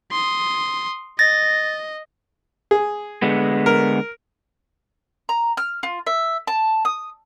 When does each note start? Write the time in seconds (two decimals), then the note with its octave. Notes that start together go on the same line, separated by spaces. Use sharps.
0.11 C6 D#6
1.19 D#5 A6 A#6
2.71 G#4
3.22 D3 G#3 B3
3.66 A#4
5.29 A#5
5.57 F6
5.83 F4
6.07 E5
6.47 A5
6.85 D#6